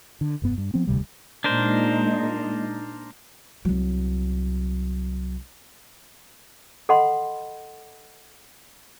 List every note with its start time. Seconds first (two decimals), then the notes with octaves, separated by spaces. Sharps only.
0.21 D3
0.42 F1 G2 B3
0.58 G2
0.74 F3 B3 C4
0.87 E1 D2 C3 G3
1.44 A#2 G#3 D4 D#4 A#4 C5
3.65 C2 F#3
6.89 A4 D#5 F#5 B5 C6